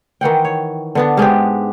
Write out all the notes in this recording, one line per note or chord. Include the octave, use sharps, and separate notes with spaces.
D#3 E3 F#5 G5
C#5
D3 B3 D4
G#2 G#3 B3 G4